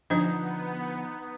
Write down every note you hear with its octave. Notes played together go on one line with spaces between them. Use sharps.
D3 F3 B3 D4 D#4 C5 D#5